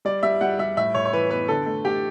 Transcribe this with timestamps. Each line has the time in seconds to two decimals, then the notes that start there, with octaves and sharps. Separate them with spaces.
0.05 G3 D5
0.23 G3 E5
0.41 G3 F#5
0.59 G3 E5
0.77 A2 E5
0.94 A2 C#5
1.05 C#5
1.13 E3 B4
1.30 B3 B4
1.48 D3 A4
1.66 A3
1.85 A3 G4